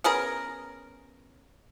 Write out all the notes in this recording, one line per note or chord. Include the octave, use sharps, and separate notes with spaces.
B3 C#4 G#4 A#4